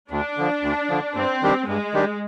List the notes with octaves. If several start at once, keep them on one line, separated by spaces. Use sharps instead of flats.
D2 D4
D3 F3
D2
D3 F3
G2 C4
D#3 G3 D4 G4
G2 G#3
D#3 G3 D4 G4